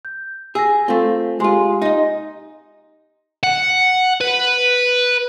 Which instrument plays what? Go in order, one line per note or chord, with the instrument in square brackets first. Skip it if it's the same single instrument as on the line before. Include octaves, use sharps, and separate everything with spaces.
[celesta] G6
[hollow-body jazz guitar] G#4 [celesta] E6 A#6
[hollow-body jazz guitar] A3 C4 [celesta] F4 A4 F5
[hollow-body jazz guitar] G#3 F4 [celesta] G4 G#5 C6
[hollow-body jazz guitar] D#4 D#5
[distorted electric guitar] F#5
B4